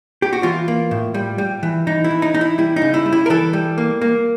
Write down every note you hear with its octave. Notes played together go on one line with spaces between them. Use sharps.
G4
F#4
E3 F4
A#3
A2
G3
G3
E3
E3 D#4
E4
E3
D#4
E3 D#4
E4
G3 E4
D#4
C#3
E4
G3
E4
A#4
E3 A4
G3
A#3
A#3